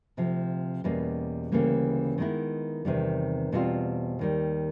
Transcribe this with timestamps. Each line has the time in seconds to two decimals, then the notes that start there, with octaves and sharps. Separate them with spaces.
0.17 D2 C3 F3
0.84 E2 B2 G3 A#3 C#4
1.52 D2 C#3 E3 G3 A#3
2.18 D#3 G#3 B3 E4
2.85 E2 C3 D#3 G3
3.52 E2 B2 G3 C4 F4
4.19 D#2 D#3 G3